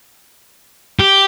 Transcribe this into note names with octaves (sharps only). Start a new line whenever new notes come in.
G4